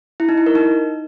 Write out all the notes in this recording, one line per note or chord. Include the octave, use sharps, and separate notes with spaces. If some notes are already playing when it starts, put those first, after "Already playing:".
E4
D#4
E4
A#4
D#4